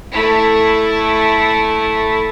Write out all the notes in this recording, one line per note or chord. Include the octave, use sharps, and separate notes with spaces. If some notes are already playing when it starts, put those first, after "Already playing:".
A3 E4